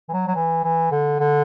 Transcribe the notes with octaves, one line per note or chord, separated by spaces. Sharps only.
E3
F#3
F#3
E3
E3
D3
D3